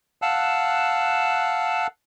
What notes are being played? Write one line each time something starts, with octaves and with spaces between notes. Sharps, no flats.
F5 F#5 A5 E6 F#6